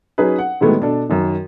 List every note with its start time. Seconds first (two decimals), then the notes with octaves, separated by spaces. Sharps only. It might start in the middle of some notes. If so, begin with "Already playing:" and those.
0.18 F#3 C#4 D#4 G#4 B4
0.39 F#5
0.61 A2 D#3 F#3 G#3 A3 B3
0.80 B2 D4 A4
1.09 F#2 D#3